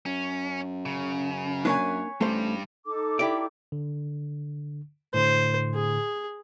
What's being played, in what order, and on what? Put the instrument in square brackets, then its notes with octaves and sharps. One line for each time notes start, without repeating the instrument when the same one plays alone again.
[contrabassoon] F#2 [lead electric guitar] C#4
[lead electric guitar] C#3
[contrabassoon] F#2 [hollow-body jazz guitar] A#3 C#4 D4 [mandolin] B4 C#5 G#5
[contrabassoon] A1 [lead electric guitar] G2 G3 [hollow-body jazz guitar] A3 C5
[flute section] D#4 A4 D6
[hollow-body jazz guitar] E4 G4 D5
[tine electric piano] D3
[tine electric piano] A2 D3 [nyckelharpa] C5
[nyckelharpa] G#4